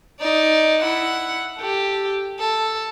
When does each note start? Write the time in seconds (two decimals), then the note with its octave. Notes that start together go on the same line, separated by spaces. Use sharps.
0.21 D#4 D5
0.82 E4 F#5
1.58 G4 A4
2.39 A4